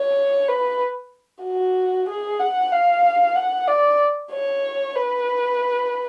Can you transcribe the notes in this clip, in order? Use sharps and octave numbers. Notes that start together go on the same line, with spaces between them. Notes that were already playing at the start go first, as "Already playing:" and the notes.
Already playing: C#5
B4
F#4
G#4
F#5
F5
F#5
D5
C#5
B4